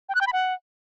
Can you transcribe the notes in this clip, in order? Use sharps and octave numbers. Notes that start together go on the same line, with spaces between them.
G5
F#6
G5
B5
F#5